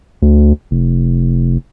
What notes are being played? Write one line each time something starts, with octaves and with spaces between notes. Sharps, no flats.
D2
F1